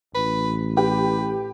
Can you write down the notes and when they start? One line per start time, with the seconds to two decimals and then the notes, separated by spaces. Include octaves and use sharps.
0.15 A1 B4
0.77 G4 B4